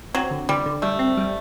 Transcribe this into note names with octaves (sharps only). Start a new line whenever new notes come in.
F#3 C4
D3
D3 G3
D3
G3 A3
C4
G3